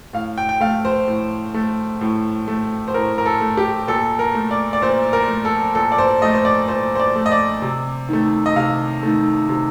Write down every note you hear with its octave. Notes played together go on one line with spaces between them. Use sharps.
A2 F5
G5
G5
A3 F5
C5
A2
A3
A2
A3
C5
A2 A#4
A#4
A4
A3
G4
A#2 A4
A#4
A3
D5
D5
A#2 C5
A#4
A3
A4
A#2 A4
D5
C5
A3 D#5
C5
D5
A#2 C5
C5
D5
A3
D#5
D5
C3
D#3 A3
D#5
C3 F5
D#3 A3
C3